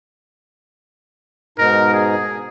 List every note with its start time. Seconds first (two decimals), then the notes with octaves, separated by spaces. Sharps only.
1.58 G#2 B2 D#4 A#4
1.93 G#4